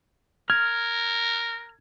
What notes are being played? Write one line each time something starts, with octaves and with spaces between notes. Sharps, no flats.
A#4 F6 G#6